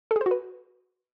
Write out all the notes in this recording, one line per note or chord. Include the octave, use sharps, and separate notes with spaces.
A4
G#4
C5
F#4
B4